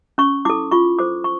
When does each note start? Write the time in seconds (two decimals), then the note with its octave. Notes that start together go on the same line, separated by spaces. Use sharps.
0.18 C#4 C#6
0.45 E4 A4 D6
0.72 F4 C#6
0.99 A4 C5 D6
1.24 C#6